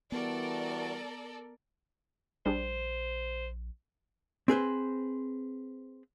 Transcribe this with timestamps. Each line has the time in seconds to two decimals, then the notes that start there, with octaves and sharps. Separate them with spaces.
0.12 E3 G3 B3 F#4 A4 A#4 D5
2.46 A#1 G3 D4 G#4 C5
4.48 C4 G#4 B4 C5